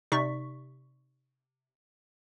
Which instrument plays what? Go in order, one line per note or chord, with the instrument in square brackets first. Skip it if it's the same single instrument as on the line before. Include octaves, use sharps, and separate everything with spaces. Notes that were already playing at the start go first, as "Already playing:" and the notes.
[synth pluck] C3 D#4 D5 C#6 B6